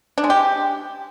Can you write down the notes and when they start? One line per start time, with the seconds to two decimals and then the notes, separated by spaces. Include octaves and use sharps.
0.18 D4
0.24 G#3
0.30 G4